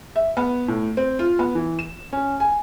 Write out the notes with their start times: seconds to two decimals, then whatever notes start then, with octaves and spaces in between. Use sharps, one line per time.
0.16 E5
0.37 B3
0.68 A2
0.97 C4
1.19 F4
1.39 B3
1.55 E3
1.79 E7
2.13 C#4
2.40 G#5